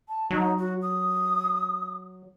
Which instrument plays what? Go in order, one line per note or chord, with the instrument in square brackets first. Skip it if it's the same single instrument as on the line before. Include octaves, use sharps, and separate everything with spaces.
[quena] A5
[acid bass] F#3 [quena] D#4
[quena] F#4
D#6